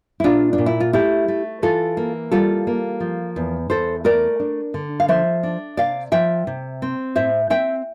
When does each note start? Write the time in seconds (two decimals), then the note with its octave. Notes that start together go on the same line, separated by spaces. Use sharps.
0.20 E4
0.24 A#2 D4 F4
0.53 D4
0.58 A#2
0.66 E4
0.80 F4
0.93 A3 E4 G4
1.28 A3
1.62 E3 F4 A4
1.97 A#3
2.31 G3 F4 A4
2.67 A#3
3.00 F3
3.36 E2
3.70 E2 A4 C5
4.04 A3 A#4 D5
4.40 D4
4.74 D3
5.00 F5
5.08 F3 C5 E5
5.43 D4
5.77 C3 D5 F5
6.12 F3 E5 G5
6.47 C3
6.82 C4
7.16 A2 C5 E5
7.50 C4 E5 G5